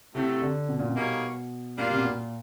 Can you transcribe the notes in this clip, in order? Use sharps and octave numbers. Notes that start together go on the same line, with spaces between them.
A2 C3 F#3 A3
D3
B2
A#2
B2
G3 A#3 D#4 G#4 C#5
A#2 G3 A#3 D4 F4
C3
B2
A#2